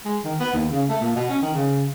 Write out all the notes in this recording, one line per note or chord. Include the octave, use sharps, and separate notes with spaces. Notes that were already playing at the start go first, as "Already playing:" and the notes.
G#3
D#3
B3
D#2
C#3
A3
A#2
B2
C#4
D#3
C#3